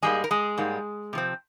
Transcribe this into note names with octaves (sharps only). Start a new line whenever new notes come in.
G#2 G3 G#3 A#3 G#4
A#4
G#3 G#4
G#2 G3 A#3
C3 F3 C4